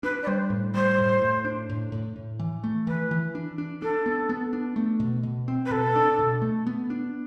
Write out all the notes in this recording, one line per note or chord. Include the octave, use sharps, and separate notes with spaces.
D4 B4
D5
G3 C5
A2
G3 C5
A2
A2
D4
A2
A2
A2
E3
A3
E3 B4
E3
D4
D4
D4 A4
B3
B3
D4
A3
B2
B2
C4
B4
B2 A4
D4
B2
A3
B3
D4